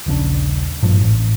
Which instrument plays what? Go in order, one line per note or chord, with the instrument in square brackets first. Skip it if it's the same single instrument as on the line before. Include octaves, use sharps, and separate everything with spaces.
[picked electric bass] D#1 A#1 C#3 D4
G#1 G2 A#2 F3
A1